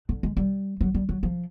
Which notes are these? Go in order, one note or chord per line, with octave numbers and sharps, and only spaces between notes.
D3
G#3
G3
F#3
G3
F#3
F3